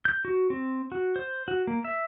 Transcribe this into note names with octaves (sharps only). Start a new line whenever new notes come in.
G6
F#4
C4
F#4
C5
F#4
A#3
E5